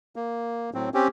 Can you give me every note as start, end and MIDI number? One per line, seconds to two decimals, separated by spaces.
0.16 0.70 58
0.74 0.89 45
0.74 0.89 54
0.74 0.89 60
0.94 1.08 60
0.94 1.08 61
0.94 1.08 67